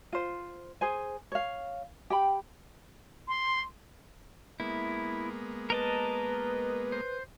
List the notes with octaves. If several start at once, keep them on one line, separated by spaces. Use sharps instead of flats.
F4 C5
G#4 C5 G#5
C#5 F5
G4 G5 B5
C6
G#3 A#3 B3 E4
A#4 B4 D#5 A5
C5